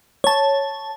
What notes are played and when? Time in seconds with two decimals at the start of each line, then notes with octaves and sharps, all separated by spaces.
0.24 C#5 A5